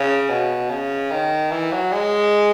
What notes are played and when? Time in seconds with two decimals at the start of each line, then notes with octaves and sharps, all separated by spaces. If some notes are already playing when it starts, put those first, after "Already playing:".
Already playing: C#3
0.29 B2
0.70 C#3
1.11 D#3
1.51 E3
1.72 F#3
1.92 G#3